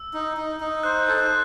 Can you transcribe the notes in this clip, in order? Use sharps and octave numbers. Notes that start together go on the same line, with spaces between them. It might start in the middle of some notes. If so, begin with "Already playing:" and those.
Already playing: E6
D#4
D#4
D#4
C5 F#6
A4
F#6